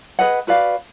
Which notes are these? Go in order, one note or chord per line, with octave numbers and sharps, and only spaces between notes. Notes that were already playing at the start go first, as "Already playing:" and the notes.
G#4 B4 D#5 F#5
F#4 B4 D5 F5